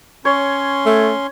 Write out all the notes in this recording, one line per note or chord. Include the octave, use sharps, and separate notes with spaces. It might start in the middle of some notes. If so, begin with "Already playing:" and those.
C#4 C#5 C6
A3